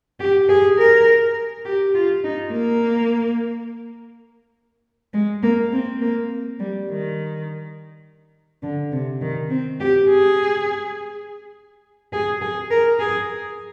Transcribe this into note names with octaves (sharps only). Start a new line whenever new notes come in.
G4
G#4
A#4
G4
F4
D#4
A#3
G#3
A#3
C4
A#3
G3
D#3
D3
C3
D#3
C4
G4
G#4
G#4
G#4
A#4
G#4